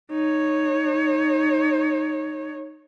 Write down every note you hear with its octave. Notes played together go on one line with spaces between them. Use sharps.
D#4 C#5